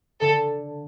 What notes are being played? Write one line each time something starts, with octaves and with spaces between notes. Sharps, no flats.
D3 A4